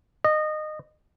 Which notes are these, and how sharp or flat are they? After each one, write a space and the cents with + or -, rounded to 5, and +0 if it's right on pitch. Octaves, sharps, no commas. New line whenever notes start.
D#5 -20